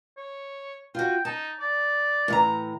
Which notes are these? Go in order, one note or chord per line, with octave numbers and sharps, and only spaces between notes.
C#5
F4 F#4 G5
D#4 A5
D5
A2 E3 A#5